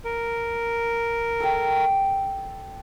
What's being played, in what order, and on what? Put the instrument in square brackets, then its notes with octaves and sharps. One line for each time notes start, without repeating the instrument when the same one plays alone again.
[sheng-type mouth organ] A#4
[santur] A4 G5